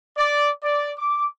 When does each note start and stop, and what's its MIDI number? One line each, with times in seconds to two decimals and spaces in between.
0.18 0.50 74
0.63 0.91 74
0.98 1.27 86